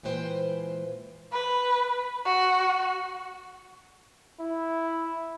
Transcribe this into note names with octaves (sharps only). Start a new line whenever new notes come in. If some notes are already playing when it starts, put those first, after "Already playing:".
A#2 E3 G#3 B4 C5 G5
B4
F#4
E4